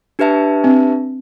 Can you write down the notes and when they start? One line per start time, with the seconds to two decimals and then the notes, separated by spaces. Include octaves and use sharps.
0.19 D4 G4 B4 E5 A5
0.64 C4